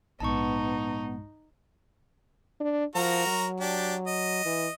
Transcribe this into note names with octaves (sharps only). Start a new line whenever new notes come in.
A#1 G#2 B3 D#4 A5 C#6
D4
F3 F#4 A#4 A#5
F#3
D4 G4
D#5
E3